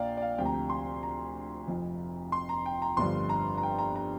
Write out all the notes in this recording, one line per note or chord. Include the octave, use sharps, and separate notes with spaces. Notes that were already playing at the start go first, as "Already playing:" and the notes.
Already playing: A#1 A#2 D5 F5 G5 A#5
D5
F5
D2 C3 F3 G5
A#5
G5
C6
A#5
F1 F2 F3
C6
A#5
G5
A#5
G1 G2 D3 F3 C6
A#5
A#5
G5
A#5
A#5